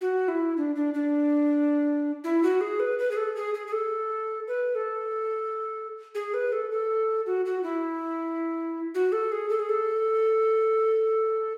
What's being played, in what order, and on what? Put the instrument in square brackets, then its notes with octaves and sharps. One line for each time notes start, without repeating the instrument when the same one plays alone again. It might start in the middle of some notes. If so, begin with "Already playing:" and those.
[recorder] F#4
E4
D4
D4
D4
E4
F#4
G#4
B4
B4
G#4
A4
G#4
G#4
G#4
A4
B4
A4
G#4
B4
A4
A4
F#4
F#4
E4
F#4
A4
G#4
A4
G#4
A4